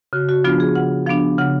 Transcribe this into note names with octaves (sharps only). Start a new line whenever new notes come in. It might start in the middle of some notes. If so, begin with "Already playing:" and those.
C#3 F#4
F#4
F3 B3 D4 F4
G#4
C#3 F#5
F3 B3 D4 F5
C#3 F#5